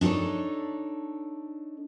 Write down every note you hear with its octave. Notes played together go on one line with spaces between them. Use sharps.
D4 D#4 F#4 A4 C#5